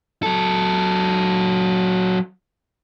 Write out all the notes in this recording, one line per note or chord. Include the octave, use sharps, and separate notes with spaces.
F#3 A4